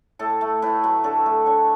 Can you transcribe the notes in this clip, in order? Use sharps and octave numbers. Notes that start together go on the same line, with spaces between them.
A2 A4
A3
A2 B4
F#3 B4
D3 A4
A3 A4
D3 C#5